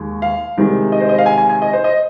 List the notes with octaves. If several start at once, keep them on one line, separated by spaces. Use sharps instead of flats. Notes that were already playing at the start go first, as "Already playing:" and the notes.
Already playing: D#2 D#3 G#3
F5
C2 C3 D#3 G#3
D#5
C5
D#5
F5
G#5
G#5
G#5
D#5
C5
D#5